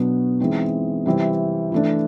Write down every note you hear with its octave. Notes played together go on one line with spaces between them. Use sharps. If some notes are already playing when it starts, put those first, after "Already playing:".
Already playing: B2 F#3 B3 D4
E3 G#3 C4 D#4
C3 E3 G3 C4
E3 A3 D4